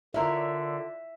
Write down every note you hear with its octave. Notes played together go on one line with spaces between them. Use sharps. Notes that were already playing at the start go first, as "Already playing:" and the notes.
D3 E4 F4 A#4 C#5 D5 E5 F5